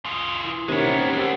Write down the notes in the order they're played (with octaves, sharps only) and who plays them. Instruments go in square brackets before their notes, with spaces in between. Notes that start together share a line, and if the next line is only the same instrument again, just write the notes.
[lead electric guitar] F4 G#4
[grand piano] E3
[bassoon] C3 [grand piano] D#3 A#3 C#4 [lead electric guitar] G#3 B3
[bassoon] C4
[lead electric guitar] A3 D4 [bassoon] G4 [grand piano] F#5